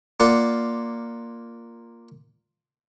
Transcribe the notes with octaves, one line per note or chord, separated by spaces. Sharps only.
A#3 F4 D5 F#5